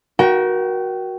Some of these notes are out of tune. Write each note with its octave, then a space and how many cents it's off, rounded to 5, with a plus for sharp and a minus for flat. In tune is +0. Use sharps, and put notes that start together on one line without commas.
F#4 +0 A#4 +30 G5 -25